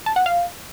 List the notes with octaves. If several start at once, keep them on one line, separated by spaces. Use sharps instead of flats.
A5
F#5
F5